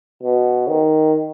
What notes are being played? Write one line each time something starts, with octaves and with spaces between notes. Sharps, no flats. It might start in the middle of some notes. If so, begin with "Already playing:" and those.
B2
D#3